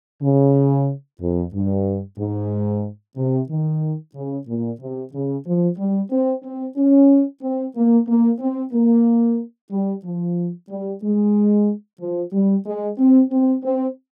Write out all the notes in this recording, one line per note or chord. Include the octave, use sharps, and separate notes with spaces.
C#3
F2
G2
G#2
C3
D#3
C#3
A#2
C3
C#3
F3
G3
C4
C4
C#4
C4
A#3
A#3
C4
A#3
G3
F3
G3
G#3
F3
G3
G#3
C4
C4
C4